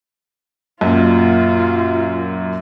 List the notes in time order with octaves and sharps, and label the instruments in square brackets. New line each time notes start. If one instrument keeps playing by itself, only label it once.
[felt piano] F#2 A#2 [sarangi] F4